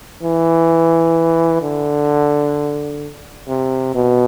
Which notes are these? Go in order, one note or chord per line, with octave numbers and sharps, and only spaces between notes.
E3
D3
C3
B2